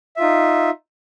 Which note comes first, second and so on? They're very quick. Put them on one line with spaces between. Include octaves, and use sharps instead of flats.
E5 F4 D#4